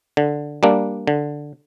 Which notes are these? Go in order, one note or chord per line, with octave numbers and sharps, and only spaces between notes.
D3
G3 A#3 D4
D3